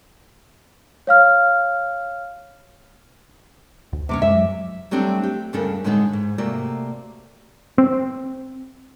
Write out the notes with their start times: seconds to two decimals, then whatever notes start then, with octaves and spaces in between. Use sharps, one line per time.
1.07 C#5 F5 F6
3.93 D2
4.09 C3 C4 C#4 D6
4.22 F#2 G#3 E5
4.34 F#3
4.91 F#3 G3 A3 C4 D4
5.23 G4
5.53 D2 G2 C#3 D4 A4 A#4
5.84 A2 D3 G3 G#3 B3 D#4
6.13 G#2
6.38 C3 A3 A#3 F#4 D5
7.78 C4